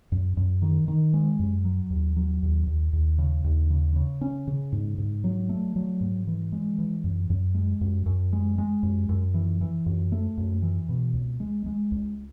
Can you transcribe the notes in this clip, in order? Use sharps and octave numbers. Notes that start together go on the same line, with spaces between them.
F#2
F#2
D#3
D#3
G#3
F#2
F#3
D#2
F#3
D#2
D#2
D#2
C#3
D#2
C#3
C#3
C#4
C#3
G#2
G#2
F#3
A3
F#3
G#2
E3
G#3
E3
F#2
F#2
G#3
F#2
F#2
G#3
G#3
F#2
F#2
E3
E3
F#2
A3
F#2
E3
B2
C#2
G#3
G#3
C#2